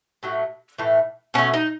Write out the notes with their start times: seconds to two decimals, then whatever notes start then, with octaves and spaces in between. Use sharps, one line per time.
0.23 A2 F#3 A3
0.78 A2 E3 A3
1.34 B2 A3 C#4
1.54 D#4